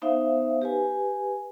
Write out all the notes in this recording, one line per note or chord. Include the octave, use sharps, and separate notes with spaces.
B3 D#4 C5 E5 F5
G4 B4 G#5